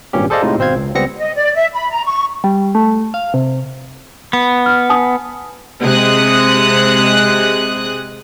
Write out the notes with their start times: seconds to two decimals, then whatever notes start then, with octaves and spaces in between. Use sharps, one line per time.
0.13 G#1 G2 A#2 C#4 G4
0.30 G#4 A4 C5 D5 D#5 F5
0.42 A2 C3 G#3 D#4 F4
0.58 G#1 B2 C4 C5 F5 G#6
0.75 C#2
0.95 C#2 G3 B3 C4 A#6 C#7
1.16 D#5
1.36 D5
1.55 E5
1.72 B5
1.90 A#5
2.04 C#6
2.44 G3
2.75 A3
3.14 F5
3.34 C3
4.33 B3
4.66 F6
4.90 G#5 A5 D#6
5.83 C3 G#3 D#6 F#6